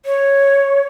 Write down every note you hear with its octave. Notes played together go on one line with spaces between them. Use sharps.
C#5